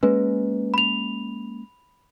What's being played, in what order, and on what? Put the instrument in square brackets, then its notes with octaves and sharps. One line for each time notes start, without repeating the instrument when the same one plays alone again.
[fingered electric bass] G#3 A#3 C#4 [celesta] B4
[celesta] B5 F7